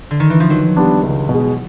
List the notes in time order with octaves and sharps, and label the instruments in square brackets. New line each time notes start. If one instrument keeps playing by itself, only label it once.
[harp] D3
D#3
E3
F3
[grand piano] D#3 [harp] F#3
[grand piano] G3 B3 D4
C#2
B2
G#3